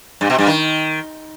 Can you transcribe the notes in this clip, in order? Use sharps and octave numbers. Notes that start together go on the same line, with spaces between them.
G2
B2
G2
D#3